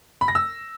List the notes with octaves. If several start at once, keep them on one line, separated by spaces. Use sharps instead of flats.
B5
A#6
E6